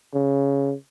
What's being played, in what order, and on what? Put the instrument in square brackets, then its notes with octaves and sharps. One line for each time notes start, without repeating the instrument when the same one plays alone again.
[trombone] C#3